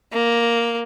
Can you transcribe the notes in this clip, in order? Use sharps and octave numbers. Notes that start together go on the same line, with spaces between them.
A#3